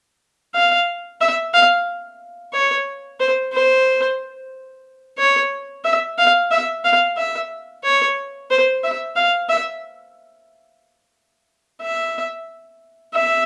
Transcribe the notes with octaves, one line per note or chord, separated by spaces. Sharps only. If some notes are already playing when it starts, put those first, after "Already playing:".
F5
E5
F5
C#5
C5
C5
C#5
E5
F5
E5
F5
E5
C#5
C5
E5
F5
E5
E5
E5